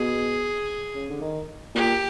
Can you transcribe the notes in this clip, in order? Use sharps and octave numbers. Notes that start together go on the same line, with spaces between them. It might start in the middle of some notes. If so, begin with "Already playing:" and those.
Already playing: B2 G#4
C#3
D3
D#3
A#2 G4